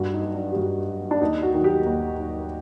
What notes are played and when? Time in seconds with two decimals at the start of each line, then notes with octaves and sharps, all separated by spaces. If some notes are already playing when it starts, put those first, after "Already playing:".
Already playing: G2 F#4
0.14 D#4
0.25 F#3
0.35 D4
0.52 G4
0.56 G2 F#4
0.89 F#3
1.11 D4
1.21 D#2 D#4
1.43 F#4
1.54 D#3 F#3
1.64 G4
1.86 D#2
2.18 D#3 F#3